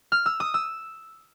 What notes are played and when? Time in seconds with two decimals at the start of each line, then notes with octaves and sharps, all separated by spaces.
0.12 F6
0.26 E6
0.40 D#6
0.54 E6